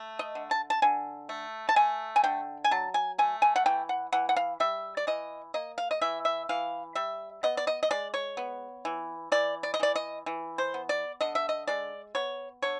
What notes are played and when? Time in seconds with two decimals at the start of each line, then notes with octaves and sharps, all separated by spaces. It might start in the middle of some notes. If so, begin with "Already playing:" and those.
Already playing: A3
0.19 D#5
0.35 D3
0.51 A5
0.70 A5
0.82 D3 G#5
1.29 A3
1.69 A5
1.76 A3 G#5
2.16 G#5
2.24 D3 G5
2.64 G#5
2.71 F#3 A5
2.94 G#5
3.18 A3 G#5
3.42 G#5
3.56 F#5
3.66 E3 G5
3.89 F#5
4.12 E3 F#5
4.29 F#5
4.36 F5
4.60 G3 E5
4.97 D5
5.07 E3 D#5
5.54 A#3 D#5
5.78 F5
5.91 D#5
6.01 E3 E5
6.25 E5
6.49 E3 F5
6.95 G3 E5
7.43 B3 D#5
7.57 D5
7.67 D#5
7.83 D#5
7.90 G#3 D5
8.14 C#5
8.37 B3
8.85 E3
9.32 E3 D5
9.63 D5
9.74 D#5
9.80 E3 D5
9.95 D#5
10.26 E3
10.58 C5
10.74 B3
10.89 D5
11.21 D3 D#5
11.35 E5
11.49 D#5
11.68 G#3 D5
12.15 B3 C#5
12.62 D3 C#5